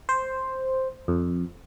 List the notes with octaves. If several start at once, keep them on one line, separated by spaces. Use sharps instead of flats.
C5
F2